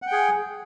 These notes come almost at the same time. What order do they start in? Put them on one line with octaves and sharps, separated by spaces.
F#5 G5 G#4